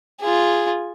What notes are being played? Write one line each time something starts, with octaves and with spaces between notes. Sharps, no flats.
F4 G#4